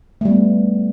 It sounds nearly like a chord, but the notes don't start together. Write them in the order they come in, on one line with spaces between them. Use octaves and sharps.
A3 G3 B3